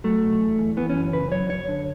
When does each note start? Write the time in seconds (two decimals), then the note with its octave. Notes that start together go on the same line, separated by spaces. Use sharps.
0.04 F#3 A3
0.23 B1
0.41 E2
0.58 E2
0.77 E3 B3
0.90 F#2 C#4
1.13 C#3 B4
1.32 F#3 C#5
1.50 F#2 C#5
1.68 D3